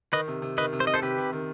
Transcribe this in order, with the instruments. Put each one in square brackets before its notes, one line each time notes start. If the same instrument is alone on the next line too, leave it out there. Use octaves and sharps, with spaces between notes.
[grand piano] D#3 [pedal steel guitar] B4 D#5
[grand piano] C3
C3
[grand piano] D#3 [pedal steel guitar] B4 D#5
[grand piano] C3
[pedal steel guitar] C5
[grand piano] C3 [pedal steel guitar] D#5
[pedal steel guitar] A4 C5
[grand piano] C3 [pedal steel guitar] G4 B4
[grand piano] C3
D#3